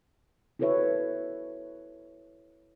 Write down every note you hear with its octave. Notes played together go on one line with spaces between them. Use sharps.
E4 F#4 A4 B4 C#5 E5